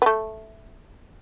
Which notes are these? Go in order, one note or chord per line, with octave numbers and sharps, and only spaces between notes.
B3
A3